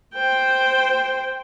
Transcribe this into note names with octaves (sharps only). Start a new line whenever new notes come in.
C5 G5